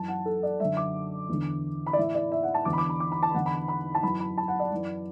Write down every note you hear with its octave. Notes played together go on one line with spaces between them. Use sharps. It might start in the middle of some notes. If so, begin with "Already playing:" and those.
Already playing: F#2 E3 A5
F#5
A4
D5
F#2 D3 E5
D6
E2 D3
B5
D5
A2 E3 E5
D5
E5
F#5
A5
E2 D3 D6
B5
D6
B5
D6
B5
A5
E2 D3 F#5
B5
B5
A5
F#2 E3 B5
B5
A5
F#5
D5
F#2 E3